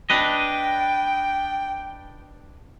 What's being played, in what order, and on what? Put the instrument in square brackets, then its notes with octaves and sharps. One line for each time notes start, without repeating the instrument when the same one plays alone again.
[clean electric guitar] D4 B4 D#5 [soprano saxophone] G5